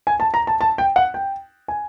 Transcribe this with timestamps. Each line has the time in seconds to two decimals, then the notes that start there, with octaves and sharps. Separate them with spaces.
0.07 G#5
0.20 A5
0.34 A#5
0.47 A5
0.61 A5
0.78 G5
0.96 F#5
1.14 G5
1.68 G#5